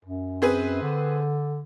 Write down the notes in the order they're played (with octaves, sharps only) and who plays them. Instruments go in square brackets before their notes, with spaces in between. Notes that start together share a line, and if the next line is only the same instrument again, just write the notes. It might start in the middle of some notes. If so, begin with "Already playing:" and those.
[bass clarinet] F#2
[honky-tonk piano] C4 G#4 B4
[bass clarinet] D3